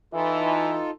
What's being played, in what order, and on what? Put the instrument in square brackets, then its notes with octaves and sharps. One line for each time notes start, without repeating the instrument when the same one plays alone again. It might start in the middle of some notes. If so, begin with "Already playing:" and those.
[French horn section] E3 [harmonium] D#4 F4 A4